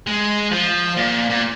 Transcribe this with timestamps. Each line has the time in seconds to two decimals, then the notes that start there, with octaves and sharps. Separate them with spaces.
0.07 G#3
0.52 F3
0.97 A#2
1.30 A#2